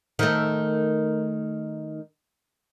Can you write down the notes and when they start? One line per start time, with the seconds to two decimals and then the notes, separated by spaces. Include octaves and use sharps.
0.19 D#3 A3